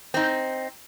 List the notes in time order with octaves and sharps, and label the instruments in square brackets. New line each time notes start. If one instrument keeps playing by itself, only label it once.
[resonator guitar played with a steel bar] C4 D#4